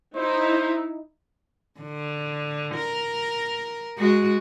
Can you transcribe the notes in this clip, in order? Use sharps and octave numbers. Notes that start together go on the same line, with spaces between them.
D#4 E4 C5
D3
A#4
G#3 F#4